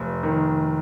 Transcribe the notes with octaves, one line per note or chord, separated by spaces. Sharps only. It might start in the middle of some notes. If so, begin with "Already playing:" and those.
Already playing: F1
D#3